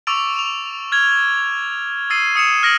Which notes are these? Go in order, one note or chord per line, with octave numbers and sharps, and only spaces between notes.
C#6 D6 E6 A6 D7 F7
E7 F7
F6 G#6 F7 G7
D#6 E6 A6 C7 D#7
D#6 C#7 D#7 E7
F6 A#6 D7 F#7